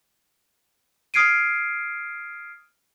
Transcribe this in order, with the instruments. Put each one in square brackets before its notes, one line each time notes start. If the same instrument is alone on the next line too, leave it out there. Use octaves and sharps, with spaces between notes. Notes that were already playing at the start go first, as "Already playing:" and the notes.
[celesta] D#6 F6 G#6 C7 D7 D#7